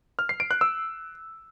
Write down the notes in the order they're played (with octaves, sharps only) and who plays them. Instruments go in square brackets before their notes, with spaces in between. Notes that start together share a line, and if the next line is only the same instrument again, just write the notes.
[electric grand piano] F6
C7
D7
F#6
E6